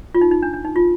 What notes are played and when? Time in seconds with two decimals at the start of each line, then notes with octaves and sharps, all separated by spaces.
0.15 F4
0.21 D#4
0.31 D#4
0.43 D4
0.54 D4
0.65 D#4
0.76 F4